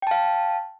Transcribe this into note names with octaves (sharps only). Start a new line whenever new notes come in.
F5 G5 A5